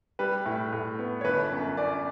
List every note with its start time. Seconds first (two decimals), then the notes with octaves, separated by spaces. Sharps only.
0.19 G3 B4
0.46 A2
0.73 A2
0.99 B3
1.21 C#5
1.24 G1 B4
1.51 F#2
1.77 F#2 D5